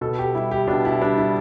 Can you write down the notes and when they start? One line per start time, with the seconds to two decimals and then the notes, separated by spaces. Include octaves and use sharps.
0.01 B2 A4
0.19 G4
0.35 G3 E4
0.51 G4
0.67 B2 D4
0.85 E4
1.01 G3 D4
1.18 E4